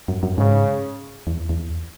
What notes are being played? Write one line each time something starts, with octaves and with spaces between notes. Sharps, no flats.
F#2
F#2
G#2 C#3
E2
E2